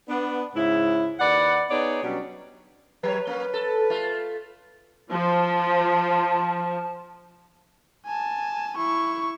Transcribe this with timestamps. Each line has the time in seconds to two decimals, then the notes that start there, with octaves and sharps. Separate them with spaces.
0.09 B3 D4
0.56 G#2 C#3 E4
1.19 D#2 B4 D5 F#5
1.71 B3 D#4 G#4 C#5 D5
2.03 B2 F#3 G3 C#4 D4
3.03 F#3 B4 C#5
3.27 A#3 C#4
3.54 A4
3.90 A3 F4
5.11 F3 A5
8.06 G#5 A5
8.77 E4 C#6